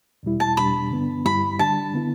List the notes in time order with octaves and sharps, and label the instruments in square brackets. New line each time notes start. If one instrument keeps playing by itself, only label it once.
[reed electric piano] E2 B2 G3 E4
[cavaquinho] A5
[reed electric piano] E2 B2 G3 D4 [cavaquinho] B5
[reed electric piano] G2 D3 B3 D4
[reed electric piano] G2 G3 E4 [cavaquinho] B5
[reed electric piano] D3 G3 D4 [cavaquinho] A5
[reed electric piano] D3 B3 E4